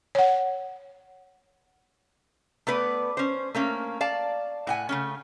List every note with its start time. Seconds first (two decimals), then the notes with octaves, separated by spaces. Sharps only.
0.15 C#5 F#5
2.67 A3 B3 B4 D5
3.17 C#4 C5
3.55 A3 A#3 C#4
4.01 D5 F5 A5
4.67 A2 F#5 G#5
4.89 C#3 A3 C#4